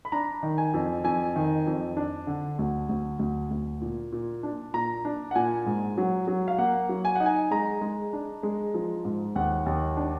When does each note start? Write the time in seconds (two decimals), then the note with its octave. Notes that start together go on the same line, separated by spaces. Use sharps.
0.05 B5
0.12 D4 A#5
0.43 D#3
0.58 G#5
0.74 F2
1.04 F2 G#5
1.36 D#3
1.67 F2
1.97 D4
2.27 D3
2.59 D2
2.89 D2
3.19 D2
3.51 D2
3.82 A#2
4.12 A#2
4.43 D4
4.74 A#2 A#5
5.05 D4
5.31 F#5
5.35 A#2 G#5
5.66 G#2
5.98 F#3
6.28 F#3
6.48 F5
6.58 A#3 F#5
6.89 F#3
7.05 G#5
7.16 D#4 F#5
7.26 G#5
7.51 G#3 A#5
7.81 G#3
8.13 D4
8.43 G#3
8.74 F3
9.05 G#2
9.36 D#2 F#5
9.66 D#2
9.97 D4